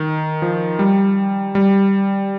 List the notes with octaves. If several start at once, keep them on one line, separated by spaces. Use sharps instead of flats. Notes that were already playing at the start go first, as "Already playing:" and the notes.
Already playing: D#3
F3
G3
G3